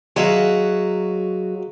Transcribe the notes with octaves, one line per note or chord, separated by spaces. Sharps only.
F#3 G#3 F#4 E5 F5